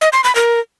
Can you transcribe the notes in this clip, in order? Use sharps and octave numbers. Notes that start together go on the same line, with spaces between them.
D#5
C6
B5
A#4